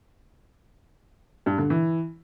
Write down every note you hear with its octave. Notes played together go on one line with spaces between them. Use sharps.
G2
D3
E3